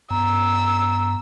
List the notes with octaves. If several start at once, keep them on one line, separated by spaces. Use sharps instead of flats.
G2 B3 A#5 E6